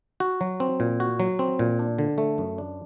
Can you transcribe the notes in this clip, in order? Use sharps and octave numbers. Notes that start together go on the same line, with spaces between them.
F#4
F#3
C4
A#2
F#4
F#3
C4
A#2
D4
D3
A3
F#2
D4